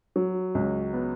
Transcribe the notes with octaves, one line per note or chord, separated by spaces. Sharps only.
F#3
C#2
B3